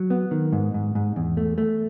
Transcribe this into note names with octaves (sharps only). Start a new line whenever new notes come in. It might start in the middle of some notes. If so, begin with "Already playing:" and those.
Already playing: F#3
B3
D#3
G#2
G#2
G#2
E2
A3
A3